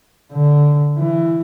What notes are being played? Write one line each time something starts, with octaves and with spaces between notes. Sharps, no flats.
D3
E3